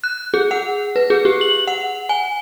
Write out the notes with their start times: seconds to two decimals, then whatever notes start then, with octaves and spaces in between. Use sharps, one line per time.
0.04 F#6
0.34 G#4
0.51 F#5
0.96 B4
1.10 G#4
1.25 G4
1.41 F#7
1.67 F#5
2.09 G#5